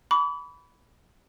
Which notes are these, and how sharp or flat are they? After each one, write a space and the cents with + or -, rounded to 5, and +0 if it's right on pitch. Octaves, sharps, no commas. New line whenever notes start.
B5 +0 D6 -45